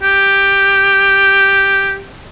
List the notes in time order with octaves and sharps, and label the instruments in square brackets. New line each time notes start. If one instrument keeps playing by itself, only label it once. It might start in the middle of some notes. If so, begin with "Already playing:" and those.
[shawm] G4